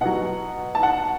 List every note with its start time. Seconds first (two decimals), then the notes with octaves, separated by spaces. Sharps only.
0.01 B2 F#3 F#5
0.75 A5
0.83 F#5